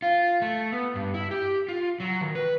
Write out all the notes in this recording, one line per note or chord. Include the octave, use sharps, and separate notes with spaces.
F4
A3
B3
G2
E4
G4
F4
F#3
D#3
B4